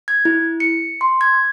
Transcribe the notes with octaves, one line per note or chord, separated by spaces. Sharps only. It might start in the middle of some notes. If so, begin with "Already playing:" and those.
G#6
E4
C#7
C6
G#6